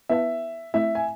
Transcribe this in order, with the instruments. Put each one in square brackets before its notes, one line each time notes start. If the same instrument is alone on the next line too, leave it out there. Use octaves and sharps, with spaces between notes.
[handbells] B3 E4 B4 F5 A5 [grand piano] E5
[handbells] A3 C4 E4 [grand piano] E5
[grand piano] G#5